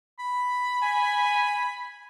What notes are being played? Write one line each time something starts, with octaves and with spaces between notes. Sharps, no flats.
B5
G#5